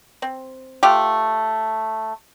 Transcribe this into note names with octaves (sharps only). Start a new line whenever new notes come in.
C4
A3 F4 G4